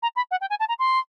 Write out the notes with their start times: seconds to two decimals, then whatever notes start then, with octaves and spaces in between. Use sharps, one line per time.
0.03 A#5
0.16 B5
0.31 F#5
0.41 G5
0.50 G#5
0.60 A5
0.69 A#5
0.79 C6